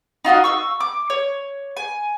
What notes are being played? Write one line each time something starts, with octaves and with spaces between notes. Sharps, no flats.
D#4 F4 F#4 D#5
C#6 E6
D6
C#5
G#5